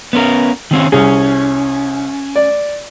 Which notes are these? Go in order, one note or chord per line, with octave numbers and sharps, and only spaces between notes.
B3 C#4 A#4
D#3 C4 C#4
C2 C#4 G#4
D5